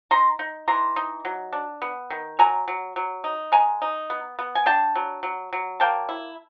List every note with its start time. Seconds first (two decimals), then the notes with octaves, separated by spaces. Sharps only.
0.11 D#4 A#5 C6
0.39 D#4
0.68 E3 A#5 C6
0.96 D#4
1.25 F#3
1.53 D4
1.82 B3
2.10 D#3
2.39 F#3 G#5 A#5
2.68 F#3
2.96 F#3
3.24 D#4
3.52 G#3 G#5 A#5
3.82 D#4
4.10 B3
4.39 B3
4.55 G#5
4.66 D4 G5 A5
4.95 F#3
5.23 F#3
5.53 F#3
5.80 A#3 G5 A5
6.09 E4